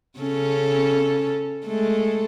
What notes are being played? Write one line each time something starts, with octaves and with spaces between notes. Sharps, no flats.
C#3 C#4 A4
G#3 A3 A4